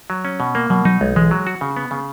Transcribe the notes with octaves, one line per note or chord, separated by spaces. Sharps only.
F#3
C#4
B2
A#3
B2 F#3
F#3 D#4
B1 G#3
E3 G#3
F#3
F#4
C#3
B3
C#3